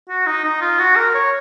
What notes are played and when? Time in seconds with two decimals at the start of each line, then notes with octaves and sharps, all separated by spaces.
0.09 F#4
0.26 D#4
0.44 D#4
0.61 F4
0.79 F#4
0.96 A#4
1.14 C#5